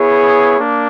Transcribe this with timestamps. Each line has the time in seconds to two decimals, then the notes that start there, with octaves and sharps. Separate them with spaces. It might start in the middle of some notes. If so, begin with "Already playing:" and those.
Already playing: B3 E4 G#4 C#5
0.58 A#3 D4